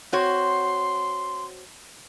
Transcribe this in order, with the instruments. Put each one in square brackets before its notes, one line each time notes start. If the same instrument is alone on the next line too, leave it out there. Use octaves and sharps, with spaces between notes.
[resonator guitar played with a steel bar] C4 F#4 C#5 [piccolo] C6